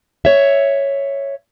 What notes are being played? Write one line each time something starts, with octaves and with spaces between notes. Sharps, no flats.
C#5 E5